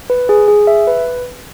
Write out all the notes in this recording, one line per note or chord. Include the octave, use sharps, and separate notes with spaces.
B4
G#4
G#4
E5
B4